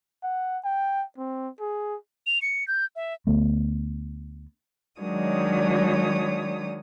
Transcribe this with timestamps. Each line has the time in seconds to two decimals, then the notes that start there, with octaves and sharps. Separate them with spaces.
0.23 F#5
0.64 G5
1.18 C4
1.60 G#4
2.27 F7
2.42 C#7
2.68 G6
2.96 E5
3.27 D2 A3 B3
5.00 D#3 F#3 G#3 D4 C#5 D#6